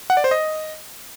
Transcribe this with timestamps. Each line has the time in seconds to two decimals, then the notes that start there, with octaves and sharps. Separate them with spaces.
0.10 F#5
0.17 D5
0.24 C5
0.31 D#5